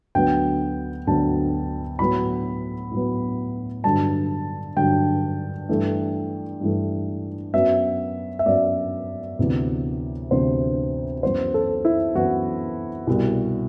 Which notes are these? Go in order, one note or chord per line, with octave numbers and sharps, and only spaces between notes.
D2 D3 F#3 B3 G5
D2 D3 F#3 B3 A5
A2 F#3 B3 B5
A2 F#3 B3
G2 D3 F#3 A5
G2 D3 F#3 G5
G2 E3 A3
G2 E3 A3
F#2 F#3 B3 E5
E5
F#2 F#3 B3 D5
D2 C3 E3 B3
D2 C3 E3 B3 C5
F#2 E3 B3 C5
A4
E4
F#2 E3 B3 F#4
C2 B2 G3 B3